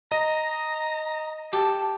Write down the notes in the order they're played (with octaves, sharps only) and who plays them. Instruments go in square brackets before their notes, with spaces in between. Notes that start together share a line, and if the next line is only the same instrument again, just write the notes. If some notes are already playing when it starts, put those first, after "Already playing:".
[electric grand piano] D#5 [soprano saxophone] A#5
[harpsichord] G4 [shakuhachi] A5